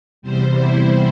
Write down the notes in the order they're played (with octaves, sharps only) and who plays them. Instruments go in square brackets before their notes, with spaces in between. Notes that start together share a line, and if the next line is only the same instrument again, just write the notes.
[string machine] E2 C3 G3 C5
E4